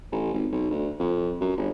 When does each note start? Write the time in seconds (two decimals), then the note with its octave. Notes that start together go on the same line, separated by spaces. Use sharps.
0.12 A1
0.34 G#1
0.52 B1
0.71 D2
0.99 F2
1.41 F#2
1.57 G1